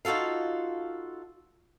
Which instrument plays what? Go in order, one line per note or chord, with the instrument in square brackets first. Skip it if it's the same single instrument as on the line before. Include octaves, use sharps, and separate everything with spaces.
[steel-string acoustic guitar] D#4 F4 F#4 A4 F5